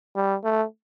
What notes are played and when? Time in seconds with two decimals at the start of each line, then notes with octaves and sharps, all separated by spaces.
0.16 G3
0.44 A3